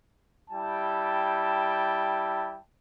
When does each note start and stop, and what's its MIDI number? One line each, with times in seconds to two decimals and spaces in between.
0.50 2.55 55
0.50 2.55 64
0.50 2.55 79
0.50 2.55 81